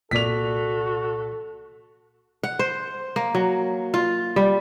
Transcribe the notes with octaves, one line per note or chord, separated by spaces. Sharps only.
C2 A#2 F#4 A4 D5 B6 F7
F#5
C5
A#3
F#3
F4
G3